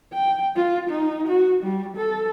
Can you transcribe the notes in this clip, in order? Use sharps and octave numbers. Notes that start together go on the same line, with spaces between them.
G5
F4
D#4
F#4
G3
A4